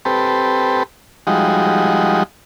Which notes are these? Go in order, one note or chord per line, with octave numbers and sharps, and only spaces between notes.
C4 G4 A4 B4
F3 G3 G#3 D#4 F#4